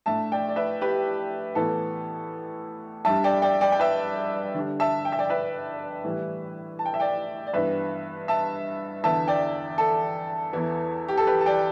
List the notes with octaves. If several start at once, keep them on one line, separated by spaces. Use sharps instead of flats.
A2 A3 D4 E5 A5
D5 G5
D5
B4 E5
G4 B4
A2 E3 B3 E4 A4
G2 G3 D4 E5 A5
D5 G5
D5 G5
D5 G5
G5
B4 E5
D3 G3 D4
E5 A5
G5
E5
D5 G5
B4 E5
A2 E3 G3 E4
A5
G5
E5
D5 G5
D5
G2 E3 B3 B4 E5
E5 A5
E2 D3 B3 E4 E5 A5
D5 G5
A4
E2 E3 B3 E4
G4
A4
G4 B4
A5
D5 G5